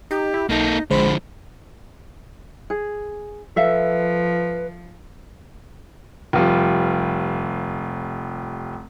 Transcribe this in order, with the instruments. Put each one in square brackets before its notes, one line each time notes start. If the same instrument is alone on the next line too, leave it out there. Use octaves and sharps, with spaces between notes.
[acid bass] D#4 [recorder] G4
[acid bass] E4
[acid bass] B1 [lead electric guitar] A#3 A4 [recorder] D#4
[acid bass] A#1 [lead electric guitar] D3 F3 [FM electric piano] G#3 C5 [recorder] B5
[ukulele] G#4
[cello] F3 [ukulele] A4 E5 F5 [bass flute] B4
[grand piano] F1 F3 G3